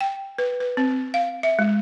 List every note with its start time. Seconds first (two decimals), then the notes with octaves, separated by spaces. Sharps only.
0.01 G5
0.39 B4
0.60 B4
0.77 C4
1.14 F5
1.43 E5
1.59 G#3